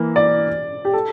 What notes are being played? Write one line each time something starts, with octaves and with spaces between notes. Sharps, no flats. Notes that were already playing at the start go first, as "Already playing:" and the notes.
Already playing: E3 A#3
D5
G4
A4